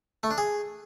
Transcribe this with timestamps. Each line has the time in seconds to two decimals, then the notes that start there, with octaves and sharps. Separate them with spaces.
0.23 A3
0.31 D4
0.38 G#4